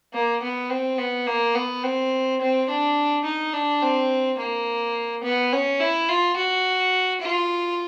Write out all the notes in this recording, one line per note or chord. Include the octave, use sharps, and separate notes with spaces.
A#3
B3
C4
B3
A#3
B3
C4
C4
D4
D#4
D4
C4
A#3
B3
C#4
E4
F4
F#4
F4